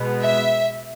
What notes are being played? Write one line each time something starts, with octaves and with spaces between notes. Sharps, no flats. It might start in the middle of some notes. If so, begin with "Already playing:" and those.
Already playing: B2 G#3 B3
E5